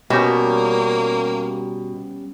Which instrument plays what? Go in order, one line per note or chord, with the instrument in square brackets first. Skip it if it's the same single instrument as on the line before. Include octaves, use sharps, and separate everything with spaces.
[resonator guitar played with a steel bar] B2 [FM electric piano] G3 C#4 G4 [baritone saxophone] A#3